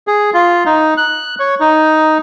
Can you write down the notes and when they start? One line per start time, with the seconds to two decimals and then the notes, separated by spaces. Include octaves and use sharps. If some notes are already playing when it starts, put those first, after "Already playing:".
0.07 G#4
0.34 F4
0.66 D#4
0.97 F#6
1.39 C#5
1.60 D#4